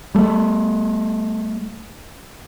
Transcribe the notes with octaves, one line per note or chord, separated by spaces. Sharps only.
G3 A3